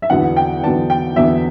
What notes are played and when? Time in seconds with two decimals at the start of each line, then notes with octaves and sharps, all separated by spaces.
0.02 E5
0.10 E2 D3 F#3 B3 D4 F#5
0.36 G5
0.63 E2 D3 F#3 B3 D4 A5
0.90 G5
1.16 E2 D3 F#3 B3 D4 E5